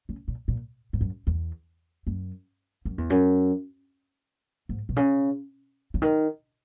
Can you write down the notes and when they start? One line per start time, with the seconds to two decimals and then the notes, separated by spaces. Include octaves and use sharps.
0.09 C#3
0.28 A#2
0.48 A#2
0.93 G#2
1.01 F#2
1.27 E2
2.07 F#2
2.85 F#2
2.98 E2
3.10 F#2
4.69 G#2
4.89 B2
4.96 C#3
5.94 C#3
6.02 D#3